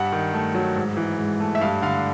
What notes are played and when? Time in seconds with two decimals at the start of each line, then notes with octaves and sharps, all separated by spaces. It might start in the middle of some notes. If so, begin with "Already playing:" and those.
Already playing: G2 F#5
0.12 D#3
0.34 A3
0.55 F#3
0.76 G#2
0.97 E3
1.18 G#2
1.40 A3
1.55 E5
1.61 G2 F5
1.82 D3 F5